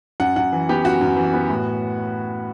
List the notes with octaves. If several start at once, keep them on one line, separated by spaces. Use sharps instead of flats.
F#2 F#5
F#2 F#5
E3
B3 G4
F#2 F#4
F#2
E3
B3
A2